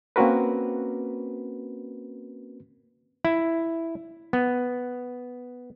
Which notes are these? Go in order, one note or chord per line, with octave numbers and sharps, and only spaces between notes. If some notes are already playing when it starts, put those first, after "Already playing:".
A#3 C4 C#4 F#4 A#4 B4
E4
B3